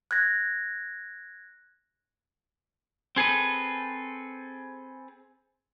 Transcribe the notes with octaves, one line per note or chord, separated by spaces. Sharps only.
F#6 G#6 A#6
C4 G#4 A4 B4